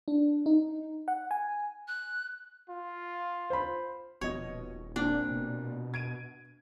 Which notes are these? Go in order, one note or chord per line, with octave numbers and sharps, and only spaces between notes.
D4
D#4
F#5
G#5
F#6
F4
C5 B5
D#1 B2 F3 C#5 D#5
A#2 C4 D4
B2
G#6 D7 D#7